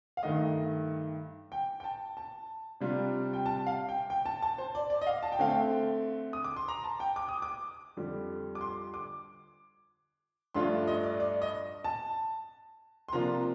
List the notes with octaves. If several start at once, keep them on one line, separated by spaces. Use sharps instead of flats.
F5
G2 D#3 A3 D#5
G5
G5
A5
A5
C3 G3 D4 F4
G5
A5
F5
G5
G5
A5
A5
C5
D5
D5
D#5
F5
A5
G5
D3 A3 C4 F5
G5
D#6
D6
C6
A#5
A5
G5
D6
D#6
D6
F2 D3 G3
D6
C6
D6
G2 F3 A3 D4 F4 C6
D#5
D5
D5
D#5
A5
C6
C3 F3 A#3 D4 F4 A#5